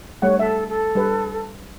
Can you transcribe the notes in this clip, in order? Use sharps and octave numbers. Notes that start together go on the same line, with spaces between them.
G3 A3 C#5 F#5
A4 E5
A4
G3 B4